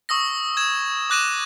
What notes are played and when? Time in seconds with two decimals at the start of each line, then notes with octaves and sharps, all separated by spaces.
0.09 C#6 D#6 E6 A#6
0.57 G#6 E7
1.10 D6 F#6 A#6 D#7 E7